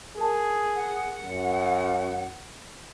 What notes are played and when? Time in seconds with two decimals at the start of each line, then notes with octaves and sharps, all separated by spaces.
0.17 G#4 A#4 A5
0.75 F#5
1.21 F#2